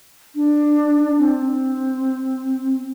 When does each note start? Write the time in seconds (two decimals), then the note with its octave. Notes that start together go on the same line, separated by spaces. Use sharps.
0.35 D4
1.19 C4